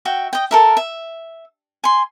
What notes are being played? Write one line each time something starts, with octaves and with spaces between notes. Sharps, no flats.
F#4 E5 G5
D#5 G5
A4 A#4 E5
E5
G#5 C6